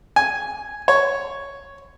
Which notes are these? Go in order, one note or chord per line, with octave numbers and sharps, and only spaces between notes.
G#5
C#5